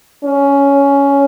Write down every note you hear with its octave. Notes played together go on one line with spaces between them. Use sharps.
C#4